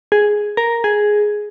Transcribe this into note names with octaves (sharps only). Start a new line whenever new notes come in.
G#4
A#4
G#4